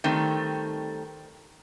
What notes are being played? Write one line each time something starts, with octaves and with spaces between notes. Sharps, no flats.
D#3 G3 A3 C4